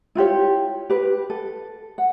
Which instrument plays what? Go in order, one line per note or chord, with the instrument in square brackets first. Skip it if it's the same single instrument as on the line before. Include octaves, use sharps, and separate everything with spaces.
[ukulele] E4 F4 G4 C#5
G4 B4
A4
F#5